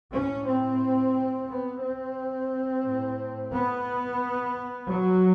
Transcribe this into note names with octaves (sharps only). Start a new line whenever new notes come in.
A2 C#4
C4
B3
C4
A2
B3
F#3